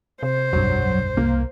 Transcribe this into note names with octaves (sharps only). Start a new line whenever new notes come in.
C3 C5
F1 B1 G2 F#3
C2 A#3